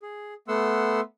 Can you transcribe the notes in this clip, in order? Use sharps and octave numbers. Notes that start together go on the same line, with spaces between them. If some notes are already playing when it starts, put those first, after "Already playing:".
G#4
A3 B3 F#5 C6 E6